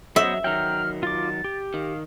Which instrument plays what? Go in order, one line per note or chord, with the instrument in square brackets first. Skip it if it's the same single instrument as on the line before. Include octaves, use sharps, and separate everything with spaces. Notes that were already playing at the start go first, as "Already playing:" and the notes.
[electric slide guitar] F#3 [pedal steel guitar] B3 C5 [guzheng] E5 [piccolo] D#6
[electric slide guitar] D#3 F#3 [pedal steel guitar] G5 A#5 [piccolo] F6
[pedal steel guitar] F4 D6 [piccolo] A6
[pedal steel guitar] G4
[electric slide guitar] D#3 [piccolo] F5